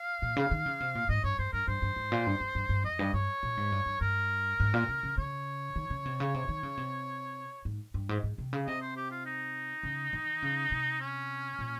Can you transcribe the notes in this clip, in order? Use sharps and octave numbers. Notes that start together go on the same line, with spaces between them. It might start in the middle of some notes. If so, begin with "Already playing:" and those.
Already playing: F5
A#2
C#3
D#3
C#3
C3
A#2
G#2 D#5
G2 C#5
G2 C5
G2 A#4
G2 C5
G2
G#2
A#2
G2
G2
G2
G2
F2 D#5
G2
G2 C#5
A#2
G#2
G2
G2
G2 A#4
G#2
A#2
C#3
C#3
C#3 C#5
D#3
C#3
C3
C#3
C3
D#3
C#3
C3
G#2
G2
G#2
G#2
C3
C#3
C3 D#5
C5
G4
F4
D#4
C#3
D#3
C#3
C3
C#4
A#2